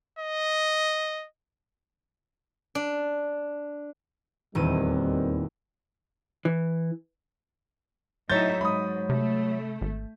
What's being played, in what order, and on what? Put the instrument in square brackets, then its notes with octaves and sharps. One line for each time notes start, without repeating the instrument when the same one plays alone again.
[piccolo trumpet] D#5
[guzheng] D4
[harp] D#1 E2 D#7 [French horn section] D#3 G3 C4
[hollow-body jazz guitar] E3
[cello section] A2 D#4 E5 [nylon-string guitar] F#3 C#5 [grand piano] G6 A6
[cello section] G#2 [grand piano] B5 D#6
[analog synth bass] C3 [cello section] A3
[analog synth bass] G#1